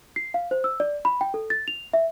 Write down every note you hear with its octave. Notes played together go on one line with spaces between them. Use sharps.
C7
F5
C5
E6
D5
B5
G5
A4
A6
F7
E5